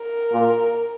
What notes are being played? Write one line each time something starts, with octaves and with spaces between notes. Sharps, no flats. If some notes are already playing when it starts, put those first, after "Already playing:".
Already playing: A#4
A#2